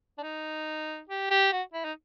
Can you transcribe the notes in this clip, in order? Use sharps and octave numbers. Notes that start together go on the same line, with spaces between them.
D4
D#4
G4
G4
F#4
E4
D#4